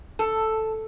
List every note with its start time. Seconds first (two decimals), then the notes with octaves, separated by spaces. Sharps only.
0.19 A4